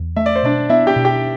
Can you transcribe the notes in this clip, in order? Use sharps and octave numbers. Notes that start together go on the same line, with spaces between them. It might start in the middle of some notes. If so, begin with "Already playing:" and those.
Already playing: E2
A3 E5
D5
C5
B2 D4 D5
B3 E4 E5
G4 G5
B2
G4 G5